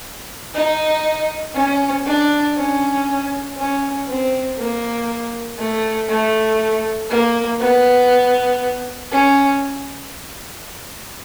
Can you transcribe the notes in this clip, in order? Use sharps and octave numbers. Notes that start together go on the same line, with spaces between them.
D#4
C#4
D4
C#4
C#4
C4
A#3
A3
A3
A#3
B3
C#4